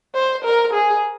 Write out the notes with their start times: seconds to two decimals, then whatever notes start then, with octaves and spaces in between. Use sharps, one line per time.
0.15 C5
0.45 A#4
0.73 G#4